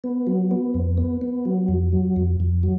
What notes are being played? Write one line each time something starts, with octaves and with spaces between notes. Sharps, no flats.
B3
F#3
B3
F2
B3
B3
F#3
F2
F#3
F2
F2
F#3